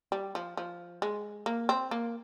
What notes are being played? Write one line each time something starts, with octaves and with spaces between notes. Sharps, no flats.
G3
F3
F3
G#3
A#3
C4
A#3